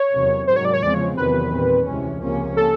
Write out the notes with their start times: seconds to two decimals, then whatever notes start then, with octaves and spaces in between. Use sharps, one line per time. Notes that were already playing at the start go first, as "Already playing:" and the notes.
Already playing: C#5
0.13 E2 C3 D#3 F#3
0.47 G#2 D#3 F#3 C5
0.56 C#5
0.65 D5
0.73 C#5
0.82 E2 C#3 F3 G#3 C4 D5
0.94 C#5
1.17 E2 C3 D#3 F#3 B4
1.52 A#2 G3 C4
1.87 D2 C3 E3 G#3 C#4
2.22 C#2 C3 F3 A#3 C#4
2.57 A4